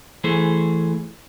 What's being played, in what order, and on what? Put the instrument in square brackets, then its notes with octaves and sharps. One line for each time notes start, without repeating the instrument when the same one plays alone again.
[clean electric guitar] E3 A3 G#4 C5